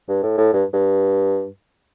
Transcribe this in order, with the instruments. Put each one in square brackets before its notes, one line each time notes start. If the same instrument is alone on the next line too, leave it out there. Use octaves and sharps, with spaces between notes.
[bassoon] G2
A2
A2
G2
G2